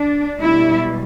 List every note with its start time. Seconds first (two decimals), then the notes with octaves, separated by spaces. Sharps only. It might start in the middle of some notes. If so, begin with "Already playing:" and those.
Already playing: D4
0.40 B2 G3 E4